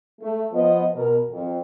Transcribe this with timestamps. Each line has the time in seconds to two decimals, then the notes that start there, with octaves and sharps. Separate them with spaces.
0.21 A3
0.52 F3 B3 D#5
0.94 B2 A#4
1.31 F2